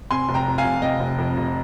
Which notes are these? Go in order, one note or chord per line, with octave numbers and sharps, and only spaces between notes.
C3 G#5 C6
F1
G5 A#5
F2
F5 G#5
F1
C3 D#5 G5
F1
F2
F1